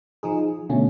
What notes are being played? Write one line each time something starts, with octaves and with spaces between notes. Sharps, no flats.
F3 D#4 G#4
B2 D3 A3 C#4